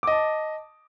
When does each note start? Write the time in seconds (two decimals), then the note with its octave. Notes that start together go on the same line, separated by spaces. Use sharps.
0.03 D6
0.07 D#5
0.12 A5